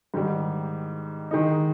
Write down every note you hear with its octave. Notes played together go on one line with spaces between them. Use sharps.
G#2 D#3 G3
D#3 G#3 D#4